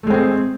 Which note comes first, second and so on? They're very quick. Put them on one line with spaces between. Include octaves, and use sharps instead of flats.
A3 G#3 C4 G#4